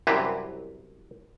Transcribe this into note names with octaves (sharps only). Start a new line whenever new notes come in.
C2 F#2 E3 C4 G4 B4